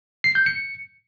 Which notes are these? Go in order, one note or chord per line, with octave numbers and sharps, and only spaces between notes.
C7
G6
C#7